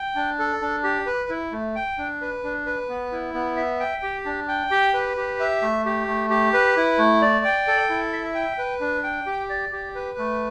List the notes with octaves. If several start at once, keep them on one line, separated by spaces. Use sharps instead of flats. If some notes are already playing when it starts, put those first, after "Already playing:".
Already playing: G5
D4
A4
D4
G4
B4
E4
A3
G5
D4
B4
D4
B4
B3
E4
B3
E5
G5
G4
D4
G5
G4
B4
G4
E5
A3
G4
A3
G4
B4
E4
A3
D5
G5
A4
E4
E5
G5
B4
D4
G5
G4
D5
G4
B4
A3